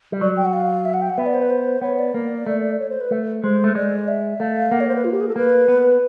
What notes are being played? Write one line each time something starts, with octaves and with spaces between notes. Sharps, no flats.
G3
F#3 D5
G5
F#5
F5
E5
F#5
G5
F#5
B3 E5
D5
C5
B4
C5
B3 C#5
D5
A#3
A3
C#5
C5
B4
A3
G#3 C5
A3
G#3 D5
E5
A3 F5
A#3 F#5
C#5
C5
B4
F4
G4
G#4
A4
A#3 B4
B3